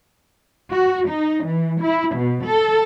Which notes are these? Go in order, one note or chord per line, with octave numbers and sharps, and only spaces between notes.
F#4
D#4
E3
E4
B2
A4